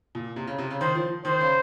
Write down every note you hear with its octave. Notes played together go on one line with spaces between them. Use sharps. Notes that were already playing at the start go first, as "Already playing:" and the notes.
A#2
C3
C#3
C3
C#3
D#3 C5
F3
D#3 C5
C#3